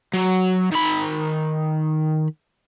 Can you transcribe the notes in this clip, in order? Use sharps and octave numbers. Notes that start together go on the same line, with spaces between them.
F#3
D#3 B5